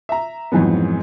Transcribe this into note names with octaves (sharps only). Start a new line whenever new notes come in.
E5 A#5
F2 G#2 E3 F#3 B3